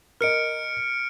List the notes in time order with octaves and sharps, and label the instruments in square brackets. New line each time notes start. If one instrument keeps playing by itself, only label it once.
[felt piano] A#4 D#5 [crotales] F6 C#7 D7